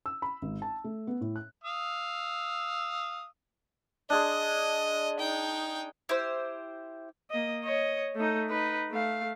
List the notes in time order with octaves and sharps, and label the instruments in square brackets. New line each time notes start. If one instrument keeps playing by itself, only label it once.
[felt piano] E6
B5
G#1
A5
A3
B3
A2
F#6
[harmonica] F5 D#6 E6
[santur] D4 G#4 C6 [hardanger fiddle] D#5
[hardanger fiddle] D#4 G5
[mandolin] E4 G4 C5
[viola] A#3 D#5
C#5 D#5
A3 D#4
D#4 B4
A3 F5